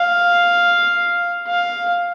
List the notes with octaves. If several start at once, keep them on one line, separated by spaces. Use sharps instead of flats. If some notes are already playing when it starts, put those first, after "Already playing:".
Already playing: F5
F5